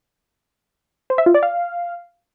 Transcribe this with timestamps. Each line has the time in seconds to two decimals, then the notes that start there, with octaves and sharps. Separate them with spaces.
1.10 C5
1.18 E5
1.26 F4
1.34 D5
1.43 F5